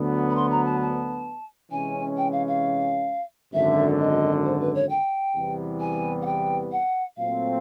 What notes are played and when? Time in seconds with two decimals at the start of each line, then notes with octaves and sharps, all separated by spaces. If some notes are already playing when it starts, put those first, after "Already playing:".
Already playing: D2 D3 F#3 B3
0.30 B5
0.35 C6
0.51 A#5
0.65 A5
0.81 A5
1.71 C3 E3 G#3 C#4 G#5
2.17 G5
2.32 F5
2.47 F5
3.53 G#1 F#2 D3 E5
3.99 D#5
4.44 C5
4.60 B4
4.74 C#5
4.89 G5
5.36 E2 C3 E3 G3 B3
5.80 G#5
6.21 F#5
6.26 G5
6.72 F#5
7.17 A#2 F#3 A3 C4 F5